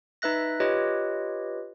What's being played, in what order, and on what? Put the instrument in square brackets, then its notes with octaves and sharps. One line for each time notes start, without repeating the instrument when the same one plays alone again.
[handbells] D#4 B4 E5 F#6 A#6
F4 G4 B4 C#5 D#5